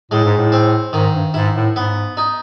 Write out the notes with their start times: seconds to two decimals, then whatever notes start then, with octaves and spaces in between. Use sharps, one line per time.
0.11 A2 G#3
0.25 G#2
0.38 A2
0.52 C4
0.93 G#2 D#3
1.14 G2
1.34 G#2 E4
1.55 A2
1.76 G#2 B3
2.17 D#4